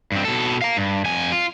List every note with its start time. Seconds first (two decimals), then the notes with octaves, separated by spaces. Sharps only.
0.12 G2 C4
0.25 B2 A4
0.62 F5 A#5
0.77 G2
1.04 F2 G#5
1.32 F4